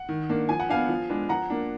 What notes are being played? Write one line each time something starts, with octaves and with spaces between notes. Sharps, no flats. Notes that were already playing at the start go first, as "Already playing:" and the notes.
Already playing: F#5
D#3
A#3 D4
F3 G#5
F#5
B3 D4 F5 G#5
F3
G#3 B3 D4
F3 F#5 A#5
A#3 D4